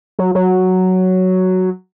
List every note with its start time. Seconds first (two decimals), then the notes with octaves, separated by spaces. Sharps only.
0.19 F#3
0.35 F#3